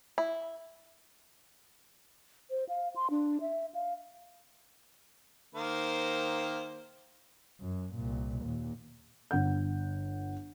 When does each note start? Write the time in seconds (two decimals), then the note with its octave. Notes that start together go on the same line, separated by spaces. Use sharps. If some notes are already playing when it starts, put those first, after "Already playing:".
0.18 E4
2.50 C5
2.69 F5
2.96 C6
3.10 D4
3.41 E5
3.74 F5
5.55 D#3 A#3 C5
7.60 F#2
7.94 C2 A#2
8.44 D#2 A#2
9.31 G1 F#5 G6